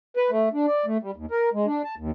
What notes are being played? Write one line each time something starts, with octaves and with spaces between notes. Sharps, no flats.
B4
A3
D4
D5
A3
G3
D#2
A#4
G#3
D4
A5
D#2